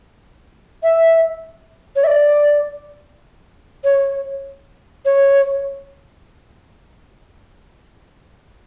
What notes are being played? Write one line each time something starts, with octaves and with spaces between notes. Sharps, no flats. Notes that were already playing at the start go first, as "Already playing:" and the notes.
E5
C#5
E5
D5
C#5
C#5